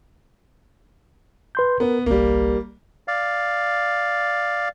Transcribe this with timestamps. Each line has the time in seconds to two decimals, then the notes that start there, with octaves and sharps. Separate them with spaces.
1.55 B4 C6 G6
1.80 B3 A#4 B4
2.06 G1 C2 G3 A#3
3.08 D5 F5